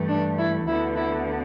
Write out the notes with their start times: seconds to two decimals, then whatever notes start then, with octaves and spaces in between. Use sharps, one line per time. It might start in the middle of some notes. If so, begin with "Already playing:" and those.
Already playing: G2 E3 A3
0.09 D4
0.38 E4
0.67 D2 D3 B3 E4
0.96 E4